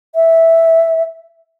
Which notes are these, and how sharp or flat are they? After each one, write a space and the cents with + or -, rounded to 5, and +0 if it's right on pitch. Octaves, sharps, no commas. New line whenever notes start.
E5 -5